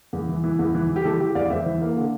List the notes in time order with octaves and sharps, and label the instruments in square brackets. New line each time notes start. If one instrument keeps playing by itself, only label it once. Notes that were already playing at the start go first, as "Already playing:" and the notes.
[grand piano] E2
E3
E3
E2
E3
E3
G4
E3 A4
E3 G4
E2 D5 F5
E2 C5 E5
E3
A#3
D3